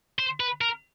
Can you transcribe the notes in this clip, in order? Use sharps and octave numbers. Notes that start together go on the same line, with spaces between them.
C5
B4
A#4